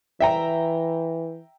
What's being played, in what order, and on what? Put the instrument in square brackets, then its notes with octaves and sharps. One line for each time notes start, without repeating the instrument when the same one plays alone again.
[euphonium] E3 [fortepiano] E5 G5 A#5